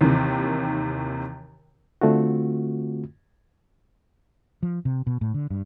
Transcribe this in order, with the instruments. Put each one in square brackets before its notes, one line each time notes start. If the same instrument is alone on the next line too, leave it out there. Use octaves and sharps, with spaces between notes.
[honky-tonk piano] D#2 C3 D#3 E3
[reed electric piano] D3 A3 C4 F4 F#4
[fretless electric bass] F3
C3
B2
A2
D3
G2